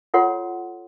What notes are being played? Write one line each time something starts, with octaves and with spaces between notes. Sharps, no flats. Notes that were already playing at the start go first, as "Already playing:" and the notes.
F4 A4 C#5 F#5 C6